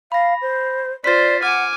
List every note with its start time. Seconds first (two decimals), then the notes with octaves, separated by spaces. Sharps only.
0.12 F5 B5 A#6
0.42 C5
1.04 F4 C5 D5 A6 B6
1.43 F#5 G#5 D6 F6